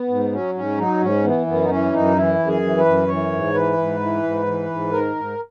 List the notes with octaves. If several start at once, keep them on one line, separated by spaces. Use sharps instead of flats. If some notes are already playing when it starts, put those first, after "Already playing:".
Already playing: B3
G#2
F#3 C#4
G#2 C#4
F#3 D#4
G#2 C#4
E3 B3
F#2 B3
D#4
E3 C#4
F#2 D#4
E3 E4
F#2
G#4
E3
B4
F#2
E3 C#5
G#2
E3 B4
G#2
E3
G#2
E3
G#2
D#3 A#4
G#2